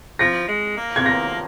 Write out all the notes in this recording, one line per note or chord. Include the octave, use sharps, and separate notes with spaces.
F3 A#6
G#3
A#3
G#6
A#6